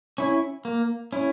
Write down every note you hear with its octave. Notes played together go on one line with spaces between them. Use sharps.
C#4 E4
A#3
C#4 E4